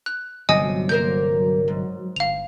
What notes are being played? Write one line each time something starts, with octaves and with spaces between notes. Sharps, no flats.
F#6
G1 D2 C3 F#3 D#5 G#5 D#6
A#3 A#4 C5 G6
G#2
G1 F5 F7